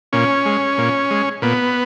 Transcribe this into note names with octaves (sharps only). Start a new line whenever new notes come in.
A#2 C#4
G#3
A#2
G#3
A#2 B3